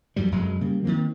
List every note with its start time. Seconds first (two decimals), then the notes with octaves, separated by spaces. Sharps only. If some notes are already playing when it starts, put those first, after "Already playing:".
0.16 F2 G#2 F#3 G3
0.31 F1 F#2 F#3 G#3
0.61 C#3 G3 A#3
0.84 D#3 F#3 A#3 C4